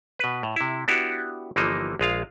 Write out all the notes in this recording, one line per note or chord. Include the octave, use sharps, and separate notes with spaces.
B2 B4
A2
C3 E4
B3 D4 E4 F#4 G4
G1 E3 F3 A#3 D#4
A#1 G#3 F4 F5